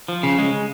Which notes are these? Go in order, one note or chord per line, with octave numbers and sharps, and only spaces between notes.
F3
C#3
G#3